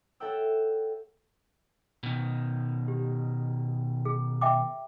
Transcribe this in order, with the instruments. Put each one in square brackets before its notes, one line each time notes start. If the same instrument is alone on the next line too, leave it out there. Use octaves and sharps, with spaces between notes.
[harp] A4 C#5 E5 F#5 G5 E6
[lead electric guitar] B2 D#3
[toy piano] G4
G#4
E5 G5 D6